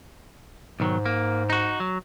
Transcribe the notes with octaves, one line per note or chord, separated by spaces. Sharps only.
B1 G#2 D#3 F#3
A#3
D#4 F#4
F#3